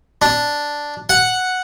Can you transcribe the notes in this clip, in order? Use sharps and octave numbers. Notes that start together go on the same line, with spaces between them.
D4
F#5